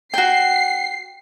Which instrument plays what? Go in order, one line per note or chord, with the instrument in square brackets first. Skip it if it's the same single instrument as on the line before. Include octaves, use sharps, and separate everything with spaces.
[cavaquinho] F#4 G5 [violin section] C7